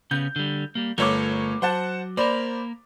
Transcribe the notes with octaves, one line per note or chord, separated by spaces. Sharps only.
C#3 B3 C#4 G6
D3 G3
G3 A#3
G1 A3 A4 A#4 C#5 D6
F#3 C5 F#5 A5
A#3 A#4 C5 D5 B5